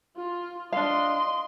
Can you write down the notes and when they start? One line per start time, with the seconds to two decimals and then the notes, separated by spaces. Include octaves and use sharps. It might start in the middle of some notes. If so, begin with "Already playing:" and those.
0.17 F4
0.72 D4 D#5 F5 C6